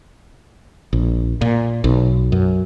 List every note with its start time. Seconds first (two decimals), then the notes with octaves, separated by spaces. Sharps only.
0.93 A#1
1.41 A#2
1.84 B1
2.32 F#2